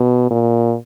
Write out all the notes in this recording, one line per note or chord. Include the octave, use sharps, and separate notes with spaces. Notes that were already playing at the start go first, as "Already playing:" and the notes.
Already playing: B2
A#2